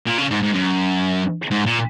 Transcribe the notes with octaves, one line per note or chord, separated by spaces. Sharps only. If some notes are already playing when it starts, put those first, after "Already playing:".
A#2
C#3
G#2
G#2
F#2
G#2
A#2